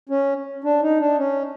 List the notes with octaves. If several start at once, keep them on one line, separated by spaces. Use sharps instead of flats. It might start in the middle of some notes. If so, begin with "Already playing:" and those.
C#4
D4
D#4
D4
C#4